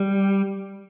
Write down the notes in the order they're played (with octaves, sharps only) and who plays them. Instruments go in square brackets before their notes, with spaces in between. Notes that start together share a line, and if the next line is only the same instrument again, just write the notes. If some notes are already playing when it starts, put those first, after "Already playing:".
Already playing: [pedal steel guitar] G3